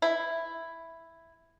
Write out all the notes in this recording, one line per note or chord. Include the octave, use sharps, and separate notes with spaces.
E4